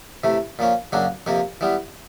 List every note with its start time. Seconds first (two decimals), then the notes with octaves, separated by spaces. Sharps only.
0.24 C3 E3 A3
0.59 A#2 F3 A#3 C#4
0.93 F#2 C#3 F#3 A#3 D4
1.26 F2 C3 F3 A#3
1.61 E3 G3 B3